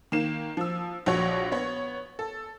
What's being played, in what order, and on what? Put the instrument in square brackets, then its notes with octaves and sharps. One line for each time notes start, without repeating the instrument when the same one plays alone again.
[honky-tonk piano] D#3 A#3 E7
F3 E6
A#1 F3 F#4 C#5
B3 C#5
A4